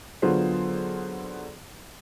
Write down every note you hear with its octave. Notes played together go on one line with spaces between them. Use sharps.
D3 F#3 B3 F4 G#4 C5